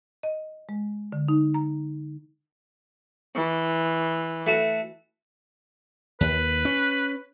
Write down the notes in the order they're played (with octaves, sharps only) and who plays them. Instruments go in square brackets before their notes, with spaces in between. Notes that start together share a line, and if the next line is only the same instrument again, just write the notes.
[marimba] D#5
G#3
D3
D#4
A#5
[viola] E3
[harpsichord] A3 F#4
[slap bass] D#2 [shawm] B4
[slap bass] C#4